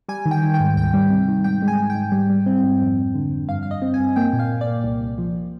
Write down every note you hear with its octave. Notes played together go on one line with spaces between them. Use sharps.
G3 G#5
D#3
G5
D#3
G5
G#2
D2 G5
G3
C3
D#3
G#2 G5
G#3
G#5
G#2
G5
G#2
G3
G3
C4
G#2
F2
F2
D3
F2
G2 F5
G2 F5
D#5
C4
G#5
G2
A#3 G5
A#2
F5
A#2
D5
A#3
C2
C2
F3